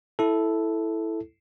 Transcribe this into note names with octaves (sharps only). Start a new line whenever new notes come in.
E4 A4